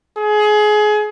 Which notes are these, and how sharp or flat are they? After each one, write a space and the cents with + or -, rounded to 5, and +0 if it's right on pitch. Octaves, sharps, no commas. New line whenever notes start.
G#4 +25